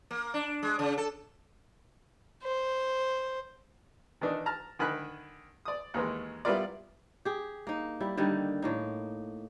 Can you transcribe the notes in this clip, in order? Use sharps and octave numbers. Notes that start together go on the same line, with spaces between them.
A#3
D4
G#3
C#3
A4
C5
D#3 E3 D4 D#4
A5 A#5 F6
D3 D#3 G#5 B5 F#6
D5 D#6
D#2 D#3 E3 G#3
G3 B3 E4 F4 A#4 D5
G4 G#4
A#3 D#4
G3 E4
D3 D#3 G3 D#4
A2 A#3 D#4